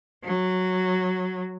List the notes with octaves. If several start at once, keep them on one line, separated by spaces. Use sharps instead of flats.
F#3